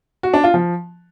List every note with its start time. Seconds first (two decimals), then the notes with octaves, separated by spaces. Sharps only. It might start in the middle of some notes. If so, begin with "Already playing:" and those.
0.23 F#4
0.34 D4
0.44 F4
0.54 F3